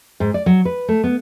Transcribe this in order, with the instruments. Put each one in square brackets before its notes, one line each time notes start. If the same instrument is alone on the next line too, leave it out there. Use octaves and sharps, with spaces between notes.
[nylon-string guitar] G#2
D5
F#3
B4
A3
B3